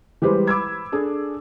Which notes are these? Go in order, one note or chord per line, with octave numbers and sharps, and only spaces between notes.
E3 G3 G#3 G4 B4 C5
B5 D6 E6 G#6
D4 G#4 A4